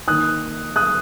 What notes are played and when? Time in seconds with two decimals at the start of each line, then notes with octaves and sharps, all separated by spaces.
0.08 D#3 A#3 D#4 D#6 F#6
0.76 D#6 F#6